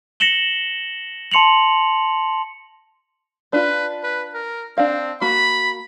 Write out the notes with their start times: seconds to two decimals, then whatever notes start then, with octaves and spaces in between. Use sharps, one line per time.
0.20 A#6 C#7 E7 F#7 G7
1.32 A5 C6 C#7 F7 F#7
3.53 D4 F4 B4
4.04 B4
4.34 A#4
4.78 C4 D4 F5
5.21 A#3 F#4 B5